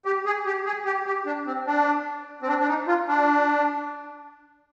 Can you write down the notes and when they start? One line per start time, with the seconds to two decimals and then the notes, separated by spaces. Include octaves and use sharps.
0.05 G4
0.26 G#4
0.46 G4
0.66 G#4
0.85 G4
1.06 G4
1.26 D4
1.46 C4
1.67 D4
2.42 C4
2.48 D4
2.60 D4
2.68 D#4
2.88 F4
3.08 D4